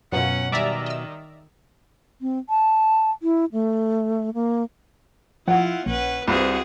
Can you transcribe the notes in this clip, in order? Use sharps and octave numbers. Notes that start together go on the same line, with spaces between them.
F#2 B2 F#3 B3 C#4 F4 F#5
D#3 G3 D5 E5 G#5 A#5
D#5 E6
C4
A5
E4
A3
A#3
F3 E4 F4 F#5
A#1 A#2 C#4 B4
C2 C4 F4 F#4 G#4 B4 C5